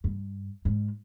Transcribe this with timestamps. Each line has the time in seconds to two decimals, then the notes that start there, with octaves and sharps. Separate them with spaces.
0.04 G2
0.65 G#2